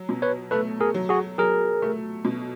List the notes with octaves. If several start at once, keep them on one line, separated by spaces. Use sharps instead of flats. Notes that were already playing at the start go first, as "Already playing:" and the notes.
Already playing: F#3
B2
B4 C#5
A3 A4 B4
G#4 A#4
F#3
F#4 G#4
F#3 G#4 A#4
A3
B2